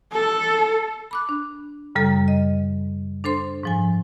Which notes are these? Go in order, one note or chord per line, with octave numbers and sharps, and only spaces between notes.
A4
B5 D6 F#6
D4
F#2 C#3 G3 A4 A#5
D#5
D4 A4 C5 C6
G#2 F3 G#5